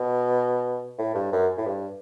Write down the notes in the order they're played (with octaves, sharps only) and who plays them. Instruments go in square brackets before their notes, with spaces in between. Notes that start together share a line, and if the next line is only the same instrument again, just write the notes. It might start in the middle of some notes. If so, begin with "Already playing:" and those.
Already playing: [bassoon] B2
A2
G2
F#2
A2
G2